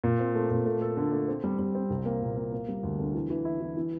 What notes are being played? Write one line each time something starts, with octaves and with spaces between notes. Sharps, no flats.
A#2
C4
A3
A#2
A3
A4
D3
A3
C4
G3
G3
C4
C2
A#3
A#2
A#3
A#3
G3
D2
D3
E3
E3
E4
E3
E3